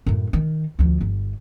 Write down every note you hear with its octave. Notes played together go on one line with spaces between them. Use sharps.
F#2 A2
D#3
D2 F3
G1